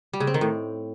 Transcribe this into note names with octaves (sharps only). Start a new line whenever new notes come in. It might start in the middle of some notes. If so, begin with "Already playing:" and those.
G3
C#3
C4
D#3
A2